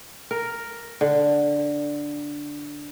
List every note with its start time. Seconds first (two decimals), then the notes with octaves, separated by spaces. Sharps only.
0.31 A#4
1.01 D3